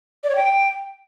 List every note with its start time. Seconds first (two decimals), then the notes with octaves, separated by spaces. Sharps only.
0.24 D5
0.30 C#5
0.35 G5